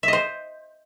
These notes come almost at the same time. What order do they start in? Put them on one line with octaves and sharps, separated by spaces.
E5 D#5 C5